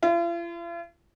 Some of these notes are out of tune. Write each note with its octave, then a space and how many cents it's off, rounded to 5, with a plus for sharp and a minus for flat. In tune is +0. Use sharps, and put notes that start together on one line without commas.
F4 -45